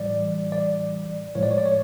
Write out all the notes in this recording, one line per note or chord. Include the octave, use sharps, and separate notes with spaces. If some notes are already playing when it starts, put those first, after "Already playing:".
Already playing: A2 E3 G3 D5
D5
A2 F3 G#3 C#5
D5
C#5
D5
C#5